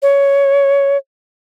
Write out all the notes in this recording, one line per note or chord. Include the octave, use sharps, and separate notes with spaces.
C#5